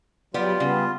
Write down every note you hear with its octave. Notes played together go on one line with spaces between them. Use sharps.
F#3 G3 B3 F4 G4 D5
C#3 G3 B3